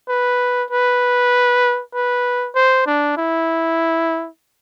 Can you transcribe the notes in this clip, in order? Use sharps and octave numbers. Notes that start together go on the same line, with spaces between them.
B4
B4
B4
C5
D4
E4